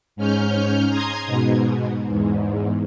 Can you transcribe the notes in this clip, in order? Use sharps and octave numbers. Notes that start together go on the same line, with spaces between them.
G#2 C#4 F6 G6
A#5 C6 D#6 G#6
G#2 B2
E2 G#2